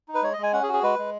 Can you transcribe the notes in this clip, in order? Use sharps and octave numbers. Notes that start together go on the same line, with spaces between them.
D#4
B4
G#3 C#5
D#5
G#3
G#5
C#4 F#5
G#4
F#4
G#4
G#3 B4
G#3